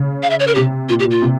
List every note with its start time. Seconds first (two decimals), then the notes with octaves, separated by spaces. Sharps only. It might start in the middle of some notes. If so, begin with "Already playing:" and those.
Already playing: C#3
0.23 F5
0.30 E5
0.40 C#5
0.47 A#4
0.55 C3 G4
0.89 A#2 F4
1.00 G4
1.05 A#2
1.11 F4
1.22 C3